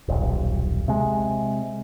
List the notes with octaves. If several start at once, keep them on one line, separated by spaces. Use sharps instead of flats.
D#1 B1
C3 G#3